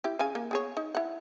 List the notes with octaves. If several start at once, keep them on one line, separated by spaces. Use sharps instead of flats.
E4 G4
C#3 F5 G#5
A#3
B3 G#4 C#5
D#4
E4 F#5